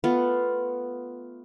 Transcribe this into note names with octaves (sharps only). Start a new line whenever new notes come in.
A3 B3 F4